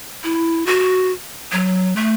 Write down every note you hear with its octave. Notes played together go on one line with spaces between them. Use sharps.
E4
F#4
F#3
A3